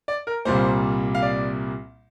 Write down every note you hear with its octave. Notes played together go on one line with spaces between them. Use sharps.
D5
A#4
C2 A#2 G3 A#3 C5
F5
D5